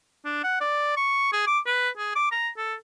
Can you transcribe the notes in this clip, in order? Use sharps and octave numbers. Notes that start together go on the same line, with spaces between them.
D4
F#5
D5
C#6
G#4
D6
B4
G#4
D6
A#5
A4